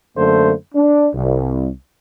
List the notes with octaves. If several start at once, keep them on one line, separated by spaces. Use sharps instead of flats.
F#2 D3 A3 A#3 C5
D4
C2